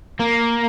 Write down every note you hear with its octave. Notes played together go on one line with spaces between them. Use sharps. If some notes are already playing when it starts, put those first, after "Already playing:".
A#3